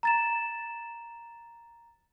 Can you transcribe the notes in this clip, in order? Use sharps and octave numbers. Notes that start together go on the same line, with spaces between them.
A#5 A6 E7